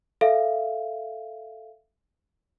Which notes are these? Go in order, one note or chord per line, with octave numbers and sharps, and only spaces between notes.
A4 E5 F5